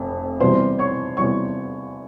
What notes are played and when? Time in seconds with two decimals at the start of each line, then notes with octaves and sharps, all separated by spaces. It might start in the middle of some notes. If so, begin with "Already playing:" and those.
Already playing: F1 F2 C3
0.40 E2 C3 G3 C5 C6
0.79 C#5 C#6
1.17 E2 C3 G3 C#5 C#6